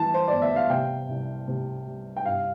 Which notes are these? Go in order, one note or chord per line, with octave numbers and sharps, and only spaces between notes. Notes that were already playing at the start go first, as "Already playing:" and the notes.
Already playing: E3 G3 A5
C5
G1 D5
E5
F5
C3 G5
C2
C3
G3
G5
G2 F5